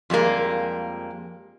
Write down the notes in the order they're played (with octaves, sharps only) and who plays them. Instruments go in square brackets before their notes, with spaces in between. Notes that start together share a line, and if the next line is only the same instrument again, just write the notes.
[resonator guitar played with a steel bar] F2 G3 G#3 A#3